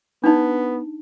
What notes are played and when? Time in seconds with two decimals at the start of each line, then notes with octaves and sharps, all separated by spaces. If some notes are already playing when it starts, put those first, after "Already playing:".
0.24 B3 D4 D#4